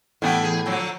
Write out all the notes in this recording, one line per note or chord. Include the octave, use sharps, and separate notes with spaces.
A2 E3 G3 B3 D4 G5
E2 G#4
D3 F3 F#3